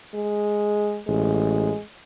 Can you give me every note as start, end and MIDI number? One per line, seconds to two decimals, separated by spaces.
0.15 1.01 56
1.08 1.71 33
1.08 1.82 56